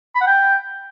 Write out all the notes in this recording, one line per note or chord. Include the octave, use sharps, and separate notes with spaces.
B5
F#5
G5